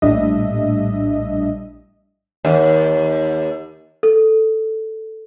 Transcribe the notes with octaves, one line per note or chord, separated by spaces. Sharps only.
A#1 A2 G3 D4 D#5 E5
D#2
A4